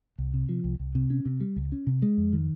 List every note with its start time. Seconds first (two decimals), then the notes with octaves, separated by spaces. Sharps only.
0.18 C2
0.34 C3
0.49 F3
0.64 C2
0.80 C2
0.95 C3
1.10 C#4
1.25 C3
1.40 G3
1.56 C#2
1.72 C#4
1.87 C3
2.02 G#3
2.18 F2
2.33 D#3